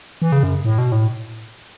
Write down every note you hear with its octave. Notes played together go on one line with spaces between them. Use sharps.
E3
C#3
F#2
A2
B2
A2